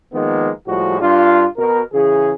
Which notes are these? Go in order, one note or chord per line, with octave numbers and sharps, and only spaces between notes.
D#3 F3 G#3 A#3 B3
A2 F3 G3 G#3 F#4
G2 D4 F4
B2 A#4
C#3 E3 G#4